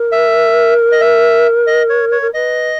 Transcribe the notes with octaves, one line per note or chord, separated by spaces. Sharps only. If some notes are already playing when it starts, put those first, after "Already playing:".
Already playing: A#4
E5
D#5
E5
D#5
C#5
C#5
A#4
B4 D#5